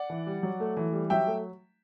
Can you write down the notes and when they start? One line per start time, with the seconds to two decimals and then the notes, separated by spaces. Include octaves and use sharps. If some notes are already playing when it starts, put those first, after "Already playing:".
Already playing: D5 F#5
0.10 E3
0.27 G3
0.43 F#3
0.60 A3
0.77 E3
0.93 G3
1.10 F#3 E5 G5
1.27 A3